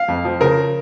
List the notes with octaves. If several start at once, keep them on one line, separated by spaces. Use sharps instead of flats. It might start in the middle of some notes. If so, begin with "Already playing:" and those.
Already playing: F5
F2
F3
C#3 A#4